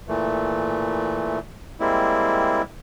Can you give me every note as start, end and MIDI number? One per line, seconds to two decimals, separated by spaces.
0.08 1.39 46
0.08 1.39 52
0.08 1.39 57
1.80 2.62 55
1.80 2.62 56
1.80 2.62 58
1.80 2.62 60
1.80 2.62 64